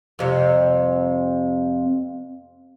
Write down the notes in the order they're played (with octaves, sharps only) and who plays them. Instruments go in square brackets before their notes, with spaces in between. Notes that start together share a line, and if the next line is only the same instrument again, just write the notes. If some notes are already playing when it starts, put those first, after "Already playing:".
[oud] F2 C3 G3